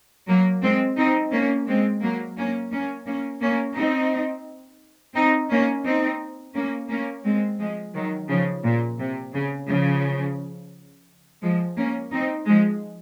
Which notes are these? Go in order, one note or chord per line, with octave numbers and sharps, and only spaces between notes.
F#3 A#3
G#3 C4
C4 D#4
A#3 C#4
G#3 C4
F#3 A#3
A#3 C#4
A#3 C#4
A#3 C#4
A#3 C#4
C4 D#4
C4 D#4
A#3 C#4
C4 D#4
A#3 C#4
A#3 C#4
G#3 C4
F3 G#3
D#3 F#3
C#3 F3
A#2
C3
C#3
C#3 F3
F3 G#3
A#3 C#4
C4 D#4
F3 G#3